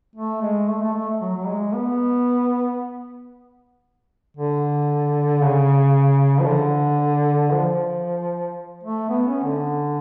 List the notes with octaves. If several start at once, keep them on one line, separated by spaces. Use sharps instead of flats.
A3
G#3
A3
A3
A3
F#3
F#3
G#3
B3
D3
C#3
F3
D3
F3
A3
B3
C#4
D3